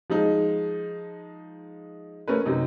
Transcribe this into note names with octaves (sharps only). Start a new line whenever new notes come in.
F3 G#3 D#4
A3 C#4 A#4 B4
F#2 C3 D#4